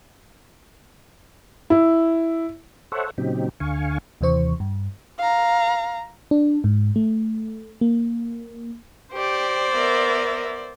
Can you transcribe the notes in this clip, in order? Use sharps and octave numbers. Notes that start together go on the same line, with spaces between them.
E4
A4 C5 C#5 E5 F#5
A#2 C#3 F#3 C4 D#4 G4
D2 D3 F5 G#5 C#6
D#2 C3 E3 C5 C#6
G2
F5 A#5
D4
G#2
A3
A#3
G4 C5 D5
B3 A#4 E5